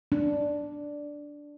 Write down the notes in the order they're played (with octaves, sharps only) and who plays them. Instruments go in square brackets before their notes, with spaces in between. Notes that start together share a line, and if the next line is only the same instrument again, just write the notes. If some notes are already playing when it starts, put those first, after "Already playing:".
[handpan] D4